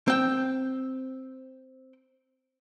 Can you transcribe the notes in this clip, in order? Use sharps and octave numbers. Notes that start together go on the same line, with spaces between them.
C4 G5